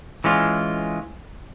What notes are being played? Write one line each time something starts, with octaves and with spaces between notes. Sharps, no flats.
E3 G#3 C#4 F4